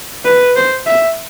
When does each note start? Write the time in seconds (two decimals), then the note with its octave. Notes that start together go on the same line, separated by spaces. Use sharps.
0.25 B4
0.56 C5
0.86 E5